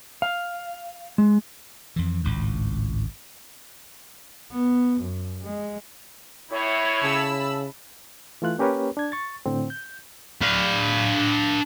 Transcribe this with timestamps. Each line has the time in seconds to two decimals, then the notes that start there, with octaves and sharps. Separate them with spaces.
0.22 F5
1.18 G#3
1.96 F2 E3
2.24 G#1 C#2 A2
4.51 B3
5.00 F#2
5.43 G#3
6.51 A2 E4 C#5
7.03 C#3 A5 B5 E6
8.42 E3 A3 F4 F#6
8.58 A#3 C#4 G4 A#4 B4 C#5
8.97 D4 G#6
9.12 C#6 A6
9.46 A2 D3 C4
9.70 G6
10.42 D4 F5